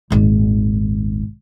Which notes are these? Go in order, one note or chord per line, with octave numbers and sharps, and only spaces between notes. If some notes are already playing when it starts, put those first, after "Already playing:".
D#1 G#1